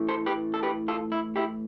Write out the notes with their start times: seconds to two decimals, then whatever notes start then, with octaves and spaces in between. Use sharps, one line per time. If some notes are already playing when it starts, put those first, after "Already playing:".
Already playing: A2 E3 A3
0.08 A4 C5
0.26 G4 B4
0.54 A4
0.63 G4 B4
0.88 F4 A4
1.12 E4
1.36 E4 G4